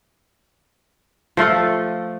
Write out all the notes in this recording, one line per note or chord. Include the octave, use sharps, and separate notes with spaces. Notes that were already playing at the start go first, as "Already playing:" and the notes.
F3 A3 F4 A4